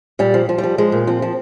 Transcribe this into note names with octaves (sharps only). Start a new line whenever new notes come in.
A#2 G3
F3
F3
G3
F3
F3 G#3
A#2
F3 C4
F3